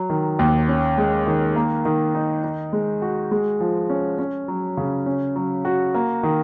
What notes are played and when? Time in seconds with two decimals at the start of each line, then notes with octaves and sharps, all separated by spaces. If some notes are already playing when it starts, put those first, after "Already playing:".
Already playing: F#3
0.10 D#3
0.39 D#2
0.68 C#4
0.98 G#3
1.27 D#3
1.56 A#3
1.85 D#3
2.15 D#4
2.44 D#4
2.73 G#3
3.02 F#4
3.31 G#3
3.61 F3
3.90 C#4
4.19 C#4
4.48 F#3
4.77 C#3
5.06 C#4
5.36 F#3
5.65 F#4
5.94 A#3
6.23 D#3